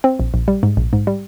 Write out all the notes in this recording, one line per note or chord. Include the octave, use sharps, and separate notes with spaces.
C4
A#1
A#1
G3
G#2
A#1
G#2
G3